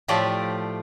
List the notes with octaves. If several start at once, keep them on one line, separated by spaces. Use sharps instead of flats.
A2 F3 A3 F4 G4 D5